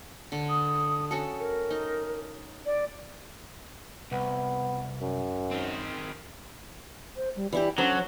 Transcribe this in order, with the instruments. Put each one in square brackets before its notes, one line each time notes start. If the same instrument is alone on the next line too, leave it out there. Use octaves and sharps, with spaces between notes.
[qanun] D3
[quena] D#6
[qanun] C#4 F#4 A4
[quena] A#4
[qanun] D#4
[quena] D5
[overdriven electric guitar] C2 [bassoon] B3
[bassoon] F#2
[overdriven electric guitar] D#3 C4
[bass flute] C5
G3
[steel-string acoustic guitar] E3 E4 G4 [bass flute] D5
[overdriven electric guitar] F#3 [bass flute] C#4 [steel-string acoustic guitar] D4 A4 C5